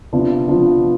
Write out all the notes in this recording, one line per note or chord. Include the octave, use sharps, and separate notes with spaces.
C3 F3 B3 D4 F4
C3 F3 B3 D4 F4